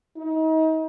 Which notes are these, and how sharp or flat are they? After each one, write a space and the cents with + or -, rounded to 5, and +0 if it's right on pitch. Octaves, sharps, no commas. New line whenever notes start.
D#4 +35